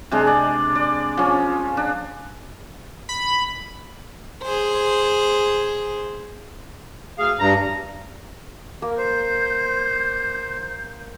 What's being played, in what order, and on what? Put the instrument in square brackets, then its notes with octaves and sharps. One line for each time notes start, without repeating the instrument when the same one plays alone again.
[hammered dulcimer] C3 G#3 D4
D5
D5
F3 C#4
D4
[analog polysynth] B5
[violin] G#4 C5
[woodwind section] D2 G#4 F5
[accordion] G2 [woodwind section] A#5
[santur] A#3 [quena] A#4
[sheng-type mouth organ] C5 [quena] G6